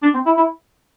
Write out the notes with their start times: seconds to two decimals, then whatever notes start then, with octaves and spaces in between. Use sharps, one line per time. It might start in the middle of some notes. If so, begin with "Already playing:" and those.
0.02 D4
0.14 C4
0.26 E4
0.37 E4